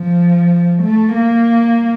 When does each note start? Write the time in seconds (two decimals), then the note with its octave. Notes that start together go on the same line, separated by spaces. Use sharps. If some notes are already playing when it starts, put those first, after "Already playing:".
Already playing: F3
0.82 A3
1.15 A#3